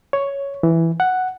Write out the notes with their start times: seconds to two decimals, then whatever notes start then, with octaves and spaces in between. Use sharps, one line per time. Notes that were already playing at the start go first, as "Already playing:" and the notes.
0.13 C#5
0.63 E3
1.00 F#5